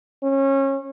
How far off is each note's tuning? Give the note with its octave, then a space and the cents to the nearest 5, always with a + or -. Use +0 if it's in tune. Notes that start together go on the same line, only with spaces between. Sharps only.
C#4 -25